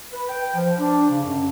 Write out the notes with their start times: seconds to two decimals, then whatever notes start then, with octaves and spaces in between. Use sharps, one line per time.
0.13 B4
0.28 G5
0.55 F3
0.78 D4
1.09 C#3
1.24 F#2